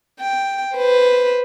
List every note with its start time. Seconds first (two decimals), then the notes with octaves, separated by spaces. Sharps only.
0.20 G5
0.76 B4 C5